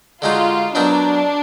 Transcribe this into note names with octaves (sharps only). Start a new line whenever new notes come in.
D3 G#3 D#4 F4 F#4
F#3 B3 D4 D#4 A#4